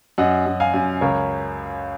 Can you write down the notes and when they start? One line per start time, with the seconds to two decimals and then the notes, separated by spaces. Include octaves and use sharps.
0.18 F#2 D#5 F#5
0.46 F#2
0.60 F5 G#5
0.74 F#2
1.01 C#2 A#4 C#5